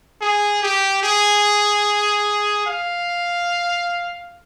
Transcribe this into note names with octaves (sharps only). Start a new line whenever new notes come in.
G#4
G4
G#4
F5